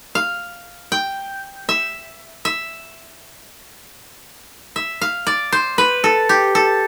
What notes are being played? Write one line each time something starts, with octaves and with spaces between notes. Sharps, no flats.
F5
G5
E5
E5
E5
F5
D5
C5
B4
A4
G4
A4